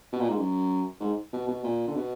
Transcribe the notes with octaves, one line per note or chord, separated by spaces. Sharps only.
B2
A#2
G#2
F#2
G#2
B2
B2
A#2
D3
B2